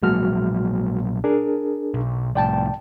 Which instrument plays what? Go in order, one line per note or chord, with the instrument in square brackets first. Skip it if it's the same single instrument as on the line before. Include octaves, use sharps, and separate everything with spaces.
[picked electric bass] A#1 F#3 A#3 [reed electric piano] G#3 F#4 F6
[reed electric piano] D4 G#4 A#4
[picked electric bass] B1
[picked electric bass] C2 A2 [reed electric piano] D5 G5 A5